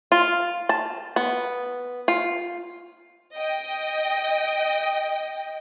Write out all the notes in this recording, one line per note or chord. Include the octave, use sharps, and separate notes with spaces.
F4
A5
B3
F4
D#5 G5